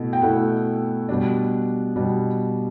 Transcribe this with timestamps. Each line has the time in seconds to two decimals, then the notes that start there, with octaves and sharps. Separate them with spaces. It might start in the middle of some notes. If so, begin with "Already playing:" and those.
Already playing: B2 A3 E4
0.13 G5
0.22 B2 A3 E4 F#5
1.09 B2 G3 D4
1.96 B2 G3 D4